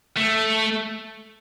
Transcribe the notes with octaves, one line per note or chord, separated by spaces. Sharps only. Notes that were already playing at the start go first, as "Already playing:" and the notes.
A3